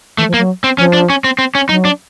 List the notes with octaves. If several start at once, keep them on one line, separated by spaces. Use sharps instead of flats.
E3 A3
F3
A#3
F#3
C4
F3 C#4
D4
C#4
C4
C4
C#4
F#3 D#4
D4